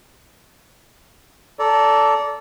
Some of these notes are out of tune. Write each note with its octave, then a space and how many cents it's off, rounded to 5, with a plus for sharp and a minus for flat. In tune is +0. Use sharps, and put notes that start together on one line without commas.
A4 +0 D5 -20 A#5 +0